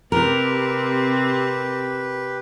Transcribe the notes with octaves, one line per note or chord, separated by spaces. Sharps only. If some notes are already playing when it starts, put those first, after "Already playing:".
C3 C4 G4 A#4 B4